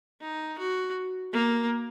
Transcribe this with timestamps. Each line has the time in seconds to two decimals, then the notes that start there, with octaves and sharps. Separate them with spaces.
0.21 D#4
0.58 F#4
1.33 A#3